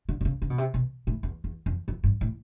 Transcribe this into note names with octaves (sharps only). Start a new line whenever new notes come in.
D3
C3
C#3
C#3
B2
C3
B2
A2
E2
E2
F2
F2
G2
A2